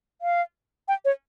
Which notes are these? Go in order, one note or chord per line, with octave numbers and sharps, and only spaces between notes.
F5
G5
C#5